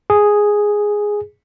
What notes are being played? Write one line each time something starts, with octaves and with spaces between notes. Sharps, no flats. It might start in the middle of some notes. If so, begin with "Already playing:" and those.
G#4